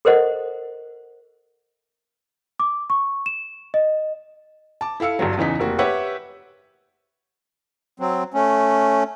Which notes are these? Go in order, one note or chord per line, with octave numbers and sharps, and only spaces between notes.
A4 A#4 C5 D#5 F#5
D6
C#6
E7
D#5
A5 D6
E4 A4 F5 E6 C#7
G1 G2 F#3
E2 C#3 E3 D#4 B6
F1 A#3 F#4
G4 B4 C#5 E5 F#5 E6
F#3 C4
A3 C#4